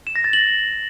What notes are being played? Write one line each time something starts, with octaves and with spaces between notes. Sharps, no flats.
E7
A#6
A6
F#7